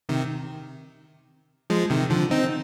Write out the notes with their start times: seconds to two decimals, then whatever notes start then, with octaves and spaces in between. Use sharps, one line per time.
0.09 C3 D#3
1.70 F3 G#3
1.90 C3 D#3
2.10 D3 F3
2.31 C4 D#4